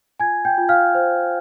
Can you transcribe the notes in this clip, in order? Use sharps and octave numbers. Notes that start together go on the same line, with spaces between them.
F4 G#5 G#6
G5 G6
F4
F5 F6
C5